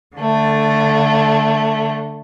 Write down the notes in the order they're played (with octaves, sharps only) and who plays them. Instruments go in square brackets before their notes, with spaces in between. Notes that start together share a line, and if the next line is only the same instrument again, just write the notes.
[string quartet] D3 A3